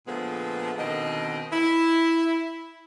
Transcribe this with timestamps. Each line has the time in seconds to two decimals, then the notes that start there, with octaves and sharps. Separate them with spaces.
0.08 A#2 D3 F3 G#3 A3 B3
0.78 B2 D3 D#3 C4 D#5
1.53 E4